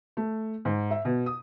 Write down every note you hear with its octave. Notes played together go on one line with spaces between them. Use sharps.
A3
G#2
E5
B2
D#6